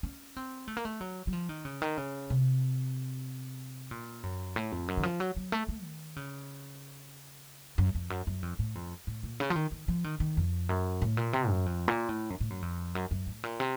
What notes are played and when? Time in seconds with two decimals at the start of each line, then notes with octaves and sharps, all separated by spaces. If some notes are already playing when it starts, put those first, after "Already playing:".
0.03 C#4
0.37 C4
0.68 A3
0.77 A#3
0.85 A3
1.01 F#3
1.27 F#3
1.33 F3
1.49 D#3
1.65 C#3
1.82 D#3
1.97 C#3
2.30 C3
3.91 A#2
4.23 F#2
4.56 A2
4.72 F2
4.88 F#2
4.97 D#3
5.03 F3
5.20 F#3
5.36 F#3
5.52 A3
5.69 A3
5.84 D#3
6.16 C#3
7.78 F#2
7.95 F2
8.10 F#2
8.27 F#2
8.43 F2
8.59 A2
8.75 F2
9.07 A2
9.23 A#2
9.40 C#3
9.50 F3
9.56 D#3
9.72 D#3
9.88 F3
10.04 D#3
10.20 D#3
10.37 F2
10.69 F#2
11.02 A2
11.17 A#2
11.33 C3
11.49 F#2
11.66 F2
11.88 A#2
12.09 A2
12.30 F#2
12.41 A2
12.50 F#2
12.62 F2
12.95 F#2
13.11 F#2
13.27 A2
13.44 A#2
13.60 C3